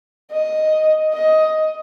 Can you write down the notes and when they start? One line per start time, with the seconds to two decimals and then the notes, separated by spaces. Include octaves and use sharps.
0.32 D#5
1.14 D#5